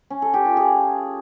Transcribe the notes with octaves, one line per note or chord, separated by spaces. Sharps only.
C#4
A4
G4
F4
G#4